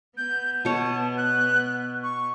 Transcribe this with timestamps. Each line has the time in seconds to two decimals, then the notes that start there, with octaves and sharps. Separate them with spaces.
0.17 B3 G6
0.65 B2 C#5 A5
1.18 F#6
2.03 C#6